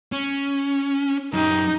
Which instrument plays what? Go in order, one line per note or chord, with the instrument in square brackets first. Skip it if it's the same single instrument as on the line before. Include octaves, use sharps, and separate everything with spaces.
[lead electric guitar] C#4
[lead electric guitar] F#2 G4 [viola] D#4